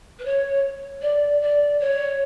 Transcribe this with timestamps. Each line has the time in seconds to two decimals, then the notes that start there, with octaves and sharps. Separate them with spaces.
0.19 B4
0.25 C#5
1.02 D5
1.41 D5
1.80 C#5